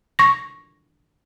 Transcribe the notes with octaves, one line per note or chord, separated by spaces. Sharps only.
C#6 A#6